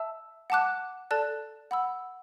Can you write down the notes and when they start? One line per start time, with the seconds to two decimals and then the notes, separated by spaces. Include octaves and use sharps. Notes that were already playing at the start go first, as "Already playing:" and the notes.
Already playing: E5 A5 E6
0.50 F#5 A5 D6 F#6
1.11 A4 D5 A5 F#6
1.71 F#5 B5 E6